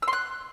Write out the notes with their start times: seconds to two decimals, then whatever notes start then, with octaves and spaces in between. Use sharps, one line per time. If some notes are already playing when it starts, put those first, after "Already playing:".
0.02 E6
0.08 C6
0.13 F#6